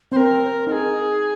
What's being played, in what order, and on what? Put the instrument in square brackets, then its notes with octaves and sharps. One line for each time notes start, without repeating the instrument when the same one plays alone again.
[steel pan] C4 [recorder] C5
[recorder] A#4
[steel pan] D#4 [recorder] A#4
[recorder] G#4